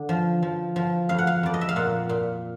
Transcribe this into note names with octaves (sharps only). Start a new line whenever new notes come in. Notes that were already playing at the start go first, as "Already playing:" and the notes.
Already playing: D3
F3
F3
F3
F2 F5
F#5
F5
F2 D5
D#5
E5
F5
A#2 F#5
A#2